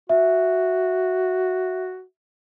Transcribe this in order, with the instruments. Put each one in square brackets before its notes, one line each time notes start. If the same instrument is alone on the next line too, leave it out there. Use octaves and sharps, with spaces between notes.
[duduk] F#4 [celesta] E5